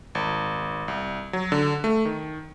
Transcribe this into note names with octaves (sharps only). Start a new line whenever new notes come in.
G#1
C2
F#3
D3
A3
D#3